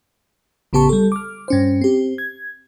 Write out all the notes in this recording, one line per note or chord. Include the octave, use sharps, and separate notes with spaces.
A1 C#3 B3 G4 A5 C#6
G3 A4
D6 F6
G2 C#4 C5
C4 G4
G#6